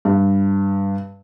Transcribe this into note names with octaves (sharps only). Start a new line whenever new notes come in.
G2